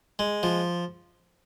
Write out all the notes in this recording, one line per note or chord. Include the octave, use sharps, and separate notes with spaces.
G#3
F3